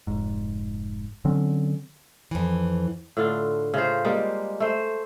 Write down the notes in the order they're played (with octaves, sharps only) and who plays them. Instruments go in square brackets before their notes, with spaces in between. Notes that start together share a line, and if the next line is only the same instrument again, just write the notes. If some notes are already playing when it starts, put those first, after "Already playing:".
[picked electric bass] F1 G#2
D3 F#3 C4 C#4
[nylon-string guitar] F2 E3
[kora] A2 D3 F4
C#3 A3 F4 C5
G3 G#3 A#3
A3 C5